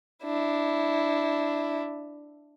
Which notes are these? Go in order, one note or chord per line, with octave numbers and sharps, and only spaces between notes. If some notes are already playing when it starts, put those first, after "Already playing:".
D4 E4